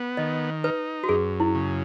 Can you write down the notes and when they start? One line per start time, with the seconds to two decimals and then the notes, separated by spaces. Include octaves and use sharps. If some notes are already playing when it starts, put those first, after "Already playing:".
Already playing: B3
0.17 D#3 D#5
0.64 D#4 B4
1.04 F#4
1.09 F#2 G#4
1.40 E4
1.55 C#3